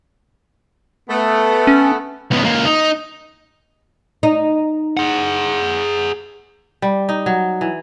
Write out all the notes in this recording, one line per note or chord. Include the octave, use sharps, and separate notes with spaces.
A3 B3
C#4
C#2 B3
C#2 A#3
D#4
D#4
G#4 F#5
G3
D#4
F#3
E3